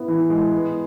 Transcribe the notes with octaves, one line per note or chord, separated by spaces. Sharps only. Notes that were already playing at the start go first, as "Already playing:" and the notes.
Already playing: B3 E4
E3
G#3
B3